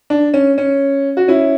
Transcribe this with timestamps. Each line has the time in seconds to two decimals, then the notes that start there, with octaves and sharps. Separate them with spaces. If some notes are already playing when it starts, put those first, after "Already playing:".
0.10 D4
0.34 C#4
0.58 C#4
1.17 F#4
1.28 C#4 E4